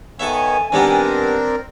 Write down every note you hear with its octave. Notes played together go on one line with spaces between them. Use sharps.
D#3 B3 A4 C#5 E5 G#5
D#3 G3 B3 C4 D4 A#4